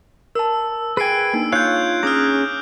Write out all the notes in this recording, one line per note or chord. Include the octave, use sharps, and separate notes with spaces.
A#4 A5 E6
G#4 B4 G5 G#5 E6 C7 D7
A#3 D4 D#4
F4 C#5 F5 F#6 G6
C#4 G#4 A#5 D6 D#6 F6